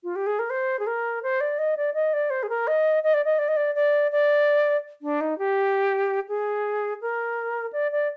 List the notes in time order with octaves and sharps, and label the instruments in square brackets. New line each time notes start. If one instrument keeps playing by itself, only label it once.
[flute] F4
G4
G#4
A#4
C5
G#4
A#4
C5
D5
D#5
D5
D#5
D5
C5
G#4
A#4
D#5
D#5
D5
D#5
D5
D#5
D5
D5
D5
D4
D#4
G4
G#4
A#4
D5
D5